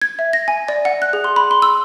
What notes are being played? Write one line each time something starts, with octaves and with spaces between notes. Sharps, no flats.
G#6
E5
A#6
G#5
D5
F#5
F#6
G#4
C6
B5
C6
E6